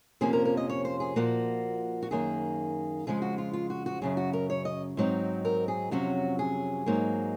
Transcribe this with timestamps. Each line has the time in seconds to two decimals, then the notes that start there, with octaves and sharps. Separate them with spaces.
0.21 F2 C3 F3 A#3 C#4 G#4
0.33 A#4
0.45 A#4
0.57 D#5
0.69 C#5
0.85 C5
1.00 G#4
1.16 A#2 F3 A#3 F#4
2.02 F#4
2.11 F#2 D#3 A#3 G#4
3.07 F2 C#3 F3 G#3 G#4
3.22 F#4
3.38 F4
3.53 F4
3.70 F#4
3.86 F#4
4.02 F#2 C#3 F#3 G#4
4.17 F#4
4.33 A#4
4.50 C#5
4.65 D#5
4.97 G#2 F#3 C4 D#4
5.45 A#4
5.68 G#4
5.91 F2 C3 F#3 C#4 F#4
6.39 G#4
6.86 G#2 F#3 A#3 D#4